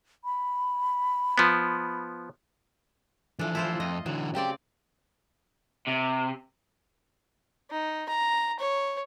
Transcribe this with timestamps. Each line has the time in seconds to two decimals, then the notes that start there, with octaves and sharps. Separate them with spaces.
0.24 B5
1.38 F3 B3
3.39 E3 F3 A3 D4
3.55 E4 F4 C5
3.80 F2 D#5
4.06 D3 E3 F#3
4.35 C#3 C4 G4 D5
5.88 C3
7.70 D#4
8.09 A#5
8.60 C#5